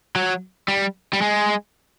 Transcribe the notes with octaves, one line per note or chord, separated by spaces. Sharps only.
F#3
G3
G3
G#3